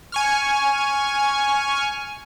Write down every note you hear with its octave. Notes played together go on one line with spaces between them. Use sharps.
G#5 C#6 F6